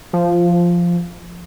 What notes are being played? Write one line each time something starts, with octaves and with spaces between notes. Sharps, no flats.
F3